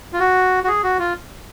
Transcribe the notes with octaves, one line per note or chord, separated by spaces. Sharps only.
F4
F#4
F#4
G#4
F#4
F4